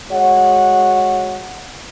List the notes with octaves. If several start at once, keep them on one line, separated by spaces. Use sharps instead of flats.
G#3 F#4 C#5 F#5